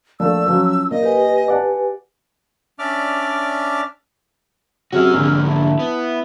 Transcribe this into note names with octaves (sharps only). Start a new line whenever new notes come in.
A#1 A3 D5 E6
F3 F#3 C#4 F4
A#2 A#4 D#5
G4 B4 G#5
D5 F#5 A5
C#4 D4 D5 E5 D6 F6
C3 F#3 C#4 F#4 G#4 E6 F6
A#1 G#2 D3
E4 A5
B3